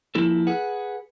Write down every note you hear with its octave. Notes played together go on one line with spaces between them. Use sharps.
F3 A#3 E4 A4
G#4 B4 F#5